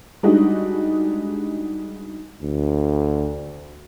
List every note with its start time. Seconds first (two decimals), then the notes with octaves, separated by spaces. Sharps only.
0.23 G3 G#3 D4 D#4 F#4 G#4
2.42 D2